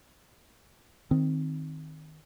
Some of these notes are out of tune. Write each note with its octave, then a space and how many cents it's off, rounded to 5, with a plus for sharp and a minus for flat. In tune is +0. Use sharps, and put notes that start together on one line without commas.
D#3 +0 C4 +0